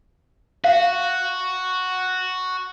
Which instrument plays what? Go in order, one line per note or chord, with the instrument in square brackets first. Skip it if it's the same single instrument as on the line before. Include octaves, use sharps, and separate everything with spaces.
[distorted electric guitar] F#4 [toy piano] F5